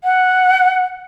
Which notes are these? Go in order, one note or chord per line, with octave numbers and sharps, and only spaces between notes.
F#5